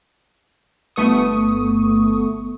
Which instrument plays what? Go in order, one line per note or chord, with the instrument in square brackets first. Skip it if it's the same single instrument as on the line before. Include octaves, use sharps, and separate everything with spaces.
[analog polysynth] G1 A3 B3 C#6 D#6